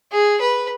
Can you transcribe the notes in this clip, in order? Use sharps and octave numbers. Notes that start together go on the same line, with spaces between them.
G#4
B4